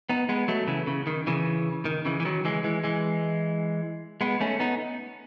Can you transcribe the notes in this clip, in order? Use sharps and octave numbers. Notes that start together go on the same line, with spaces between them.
B3 D#4
G#3 B3
F#3 A3
C#3 E3
C#3
D#3
C#3 E3
D#3
C#3 E3
E3
D#3 F#3
E3 G#3
E3 G#3
E3 G#3
G#3 B3
A3 C#4
B3 D#4